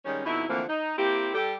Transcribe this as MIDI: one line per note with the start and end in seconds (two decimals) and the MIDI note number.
0.06 0.23 51
0.06 0.23 55
0.06 0.23 56
0.06 0.23 61
0.25 0.46 41
0.25 0.46 47
0.25 0.46 63
0.25 0.46 64
0.49 0.63 50
0.49 0.63 52
0.49 0.63 53
0.49 0.63 57
0.49 0.63 58
0.49 0.63 60
0.69 0.96 63
0.98 1.32 58
0.98 1.32 60
0.98 1.32 64
0.98 1.32 67
1.34 1.55 55
1.34 1.55 67
1.34 1.55 69